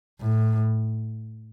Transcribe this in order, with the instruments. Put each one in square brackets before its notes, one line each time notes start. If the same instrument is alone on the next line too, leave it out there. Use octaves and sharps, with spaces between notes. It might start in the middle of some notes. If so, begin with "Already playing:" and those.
[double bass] A2